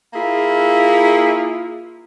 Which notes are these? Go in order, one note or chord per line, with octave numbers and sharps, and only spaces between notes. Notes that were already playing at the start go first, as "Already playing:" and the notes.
A#3 E4 F4 G#4